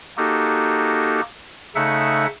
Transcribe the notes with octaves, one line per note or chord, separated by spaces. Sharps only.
A#3 D#4 F#4 G4 A4
C#3 A3 D#4 A4 E5 F#5